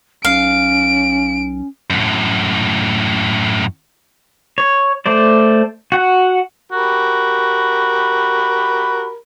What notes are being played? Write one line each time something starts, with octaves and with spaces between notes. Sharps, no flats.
B1 C#4 F5 D7
F#2 A2
C#5
A3 C5 D5
F#4 F#5
F#4 G4 A#4 B5